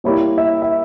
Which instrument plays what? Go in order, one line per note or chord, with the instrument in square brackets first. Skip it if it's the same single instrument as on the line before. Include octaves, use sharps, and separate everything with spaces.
[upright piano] G3 A#3 E4 G4 [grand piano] C#5
[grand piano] E5
E5